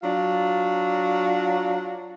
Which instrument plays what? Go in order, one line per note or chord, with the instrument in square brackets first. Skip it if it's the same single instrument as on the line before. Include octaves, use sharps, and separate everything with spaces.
[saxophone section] F#3 D4 F4